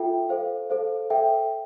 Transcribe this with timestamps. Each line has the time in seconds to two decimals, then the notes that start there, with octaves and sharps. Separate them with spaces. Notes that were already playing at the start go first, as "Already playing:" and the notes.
Already playing: F4 A4 E5 G5
0.29 A4 C5 F5
0.70 A4 C5 F5
1.10 A4 E5 G5